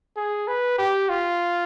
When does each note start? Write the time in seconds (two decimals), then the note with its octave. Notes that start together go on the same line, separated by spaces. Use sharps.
0.17 G#4
0.48 B4
0.78 G4
1.09 F4